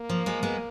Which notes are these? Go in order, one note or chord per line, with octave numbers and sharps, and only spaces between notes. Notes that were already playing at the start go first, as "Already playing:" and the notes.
Already playing: A#3
F3
F3 G#3
G#3 B3